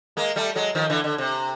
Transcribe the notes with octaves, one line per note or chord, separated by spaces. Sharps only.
G#3 A#3
G3 A3
F#3 G#3
D#3 F3
D3 E3
D3
C3